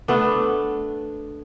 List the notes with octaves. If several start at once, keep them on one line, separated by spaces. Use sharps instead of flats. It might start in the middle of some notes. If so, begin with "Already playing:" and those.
A3 B3 D4